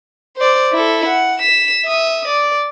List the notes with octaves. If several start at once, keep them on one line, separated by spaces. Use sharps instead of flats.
C5 D5
E4 A4
F#5
B6 E7
E5 D#6
D5